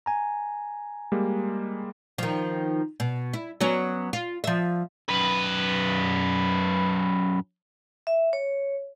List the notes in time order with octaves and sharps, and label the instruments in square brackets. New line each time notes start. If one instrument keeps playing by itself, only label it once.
[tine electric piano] G#5 A#5
[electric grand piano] G3 G#3 A#3
[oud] D#3 F3
B2
E4
F#3 B3 C#4
F4
F3 E5
[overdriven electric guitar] F#2 B4
[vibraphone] E5
C#5